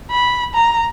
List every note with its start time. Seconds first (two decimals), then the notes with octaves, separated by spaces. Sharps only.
0.11 B5
0.54 A#5